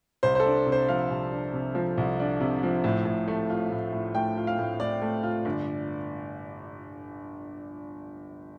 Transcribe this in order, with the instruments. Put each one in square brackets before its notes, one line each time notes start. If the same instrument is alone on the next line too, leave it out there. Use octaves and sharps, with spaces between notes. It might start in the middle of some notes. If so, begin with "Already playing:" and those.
[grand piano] C2 C5
C5
A4
D4
C3
C5
F3 F5
C2
D4
C3
F3
C2
D4
C3
F3
A2
A2
A3
F4
A2
A2
A3 G5
F4
F5
A2
A2 D5
A3
F4
G1